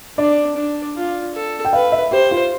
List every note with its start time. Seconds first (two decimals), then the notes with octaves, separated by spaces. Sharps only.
0.18 D4 D5
0.57 D4
0.95 F4
1.34 A4
1.65 G5
1.73 B4 F5
1.92 E5
2.11 G4 C5
2.31 F4